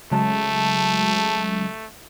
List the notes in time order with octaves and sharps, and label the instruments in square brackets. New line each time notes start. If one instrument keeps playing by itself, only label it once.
[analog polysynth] C#3 F#3 G#3 [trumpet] A3 [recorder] A5